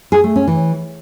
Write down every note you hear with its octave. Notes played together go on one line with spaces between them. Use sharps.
G#4
A3
C#4
E3